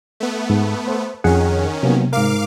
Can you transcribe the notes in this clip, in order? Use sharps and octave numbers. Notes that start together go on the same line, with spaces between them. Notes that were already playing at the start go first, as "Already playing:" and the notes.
A3 B3
G#2
C5
F2 D#3 C#4 G#4 F#5
C3 F#3 A#3 B3
G#2 A#4 F5 D6